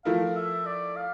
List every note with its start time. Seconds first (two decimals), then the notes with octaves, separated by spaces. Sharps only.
0.05 F3 A3 E4 A#4 F5
0.36 E5
0.66 D5
0.96 F5